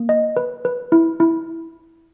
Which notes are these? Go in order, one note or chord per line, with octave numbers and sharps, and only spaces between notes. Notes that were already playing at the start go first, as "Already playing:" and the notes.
Already playing: A#3
D#5
B4
B4
E4
E4